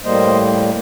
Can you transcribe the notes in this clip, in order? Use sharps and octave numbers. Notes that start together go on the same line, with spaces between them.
A2 G3 A#3 C5 D#5